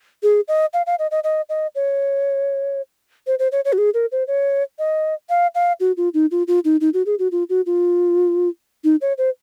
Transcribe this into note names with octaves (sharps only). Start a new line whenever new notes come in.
G#4
D#5
F5
F5
D#5
D#5
D#5
D#5
C#5
C5
C5
C#5
C#5
F#4
G#4
A#4
C5
C#5
D#5
F5
F5
F#4
F4
D#4
F4
F4
D#4
D#4
F#4
G#4
F#4
F4
F#4
F4
D#4
C#5
C5